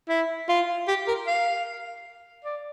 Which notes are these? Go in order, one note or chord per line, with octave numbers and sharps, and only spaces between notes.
E4
F4
G4
A#4
F5
D5